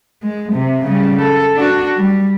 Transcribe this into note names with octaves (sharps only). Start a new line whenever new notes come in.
G#3
C3
C#3 G3
A4
D4 F#4
G3